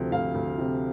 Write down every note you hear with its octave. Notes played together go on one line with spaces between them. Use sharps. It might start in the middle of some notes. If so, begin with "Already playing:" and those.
Already playing: D2 C3 F3
D2 F5
D2
C3